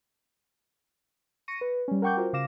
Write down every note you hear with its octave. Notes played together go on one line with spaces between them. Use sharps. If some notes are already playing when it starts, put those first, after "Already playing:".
C#6 A#6 C#7 D#7
B4
G3 C#4
A#4 F#5 G5 C#6 D6 G6
F4 F#4 A#4 C5
C#3 F5 D6 A#6 E7